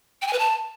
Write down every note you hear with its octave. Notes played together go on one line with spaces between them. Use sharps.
G5
G#5
B4
A5